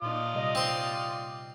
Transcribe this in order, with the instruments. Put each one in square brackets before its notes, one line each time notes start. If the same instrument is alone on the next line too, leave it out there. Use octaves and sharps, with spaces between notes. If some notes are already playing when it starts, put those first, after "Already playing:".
[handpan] A#2 D#4 [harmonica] F4 D5 D#6
[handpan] C3 G3 D#5
[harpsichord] C4 C6